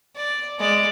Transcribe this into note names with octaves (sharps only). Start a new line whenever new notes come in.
D5
G#3 D5